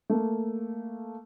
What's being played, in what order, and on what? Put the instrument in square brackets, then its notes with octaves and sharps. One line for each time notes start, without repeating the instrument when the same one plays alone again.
[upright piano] A3 A#3